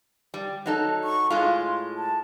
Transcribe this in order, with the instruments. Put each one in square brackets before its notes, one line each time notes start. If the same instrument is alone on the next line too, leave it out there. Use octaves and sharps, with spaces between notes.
[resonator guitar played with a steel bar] G3
F#3 D#4 A4
[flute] C#6
[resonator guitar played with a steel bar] A2 G#3 F4 [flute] C6
[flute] A5